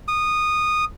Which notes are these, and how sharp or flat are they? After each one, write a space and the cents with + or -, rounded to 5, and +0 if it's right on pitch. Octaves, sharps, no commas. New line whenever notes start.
D#6 -15